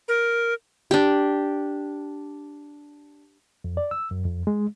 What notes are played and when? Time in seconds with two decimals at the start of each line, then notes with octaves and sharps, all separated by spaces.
0.08 A#4
0.91 D4 G4
3.64 F2
3.77 D5
3.91 E6
4.11 F#2
4.25 F2
4.47 G#3